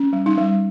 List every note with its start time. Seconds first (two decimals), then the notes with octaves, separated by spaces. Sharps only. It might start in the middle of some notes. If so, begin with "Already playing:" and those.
Already playing: C#4
0.13 G3
0.26 D#4
0.38 G3